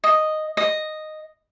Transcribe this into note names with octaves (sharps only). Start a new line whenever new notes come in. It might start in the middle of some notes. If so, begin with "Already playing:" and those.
D#5
D#5